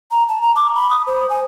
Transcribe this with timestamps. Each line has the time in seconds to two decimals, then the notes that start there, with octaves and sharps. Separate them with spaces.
0.11 A#5
0.29 A5
0.42 A#5
0.56 D6
0.75 B5
0.90 D#6
1.07 C5
1.30 G#5